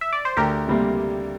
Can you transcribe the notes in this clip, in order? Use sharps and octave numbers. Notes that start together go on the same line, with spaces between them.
E5
D5
C5
D2 G4 A#4
C3 G3 A#3